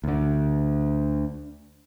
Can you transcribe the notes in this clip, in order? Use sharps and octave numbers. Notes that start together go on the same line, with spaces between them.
D2 D3